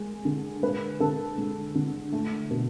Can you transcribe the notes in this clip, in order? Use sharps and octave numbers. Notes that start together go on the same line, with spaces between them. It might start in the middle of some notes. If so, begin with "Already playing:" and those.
Already playing: G#3
D3
G#3 B4
D3 A4
G#3
D3
A3
B2